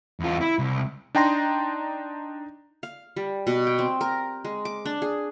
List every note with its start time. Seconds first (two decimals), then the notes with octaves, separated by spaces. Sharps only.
0.20 E2 F4
0.41 E4
0.59 C2
1.15 D4 D#4 G5 A#5 C6 A#6
2.83 F5
3.16 G3
3.47 B2
3.67 G5
3.79 C4
4.01 A#4
4.45 G#3
4.65 D6
4.85 D4
5.02 G#4